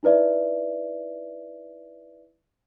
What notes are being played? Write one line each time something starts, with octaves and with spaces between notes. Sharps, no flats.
D#4 E4 B4 D5 E5